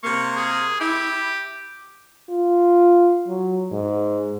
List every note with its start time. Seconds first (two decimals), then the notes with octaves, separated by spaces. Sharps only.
0.03 C3 A#3 C#6
0.36 G#4
0.80 E4 G4
2.29 F4
3.27 F#3
3.72 G#2